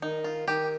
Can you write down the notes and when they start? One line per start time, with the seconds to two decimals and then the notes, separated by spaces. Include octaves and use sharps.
0.02 D#3 D#4
0.24 F4
0.47 D#3 G4